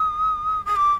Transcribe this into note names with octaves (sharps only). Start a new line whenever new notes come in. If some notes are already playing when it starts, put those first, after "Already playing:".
Already playing: D#6
D#6
D6